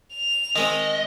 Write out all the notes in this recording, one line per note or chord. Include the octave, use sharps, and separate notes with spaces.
F7
D#3 G#3 C4 D#5